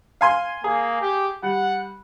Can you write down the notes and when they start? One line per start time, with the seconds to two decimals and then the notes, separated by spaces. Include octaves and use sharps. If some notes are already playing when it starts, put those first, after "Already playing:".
0.21 F5 G#5 C6
0.64 A#3 G#4
1.01 G4
1.43 G3 F#5